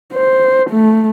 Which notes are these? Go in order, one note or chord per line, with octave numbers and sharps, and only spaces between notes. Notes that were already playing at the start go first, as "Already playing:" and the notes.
C5
A3